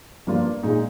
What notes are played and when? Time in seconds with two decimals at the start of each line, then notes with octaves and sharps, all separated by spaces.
0.27 G2 F3 A#3 D4 F4
0.63 A#2 G#3 D#4